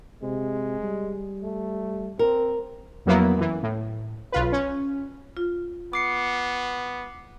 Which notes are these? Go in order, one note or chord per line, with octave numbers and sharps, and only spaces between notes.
C3 G#3
G3
A3
C4 A#4
F2 F#3 A#3 B3 E4
F#2 E3
A2
B1 F4 B4
C#4
F4
B3 D6 C7 C#7